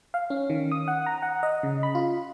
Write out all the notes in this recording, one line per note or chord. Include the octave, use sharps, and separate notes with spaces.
F5
C#4
D#3
D#6
F#5
A#5
F#5
D#5
C#3
B5
F4